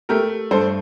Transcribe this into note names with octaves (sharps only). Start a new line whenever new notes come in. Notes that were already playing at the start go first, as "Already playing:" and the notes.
A3 G4 A#4
G2 A4 C5